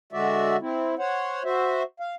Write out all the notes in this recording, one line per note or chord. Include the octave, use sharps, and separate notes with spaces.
D3 G#3 F#4 D5 E5
C4 E4
C5 C#5 F#5
F#4 C5 E5
F5